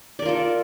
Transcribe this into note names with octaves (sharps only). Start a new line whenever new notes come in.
F4 A4 A#4 D5